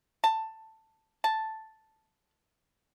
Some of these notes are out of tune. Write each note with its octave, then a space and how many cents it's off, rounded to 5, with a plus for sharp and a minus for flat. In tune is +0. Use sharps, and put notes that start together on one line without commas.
A5 +10
A5 +0